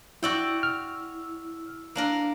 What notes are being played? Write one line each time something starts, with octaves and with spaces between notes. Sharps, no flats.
E4 F#4 D5 G5 E6
F6
A#3 D4 A#4